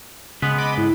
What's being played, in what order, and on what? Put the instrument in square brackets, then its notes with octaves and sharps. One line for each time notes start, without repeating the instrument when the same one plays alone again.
[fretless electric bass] C#3 [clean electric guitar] G#3 B3 B4
[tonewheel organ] D#5 B5 D6
[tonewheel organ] G#2 [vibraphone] E4